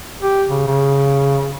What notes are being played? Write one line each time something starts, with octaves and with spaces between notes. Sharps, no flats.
G4
C#3
C#3